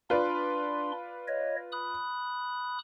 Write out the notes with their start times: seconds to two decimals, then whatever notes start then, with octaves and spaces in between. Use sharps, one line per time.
0.10 D4 F4 B4 D5 C6
1.28 C#5 D#5
1.72 B5 D#6 F#6